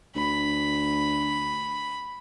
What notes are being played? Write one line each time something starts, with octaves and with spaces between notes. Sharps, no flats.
D2 B5